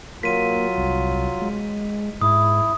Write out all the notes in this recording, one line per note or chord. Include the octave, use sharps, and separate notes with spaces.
F#3 A#3 F4 B6 D#7
C2
G#3
G#2 E4 D#6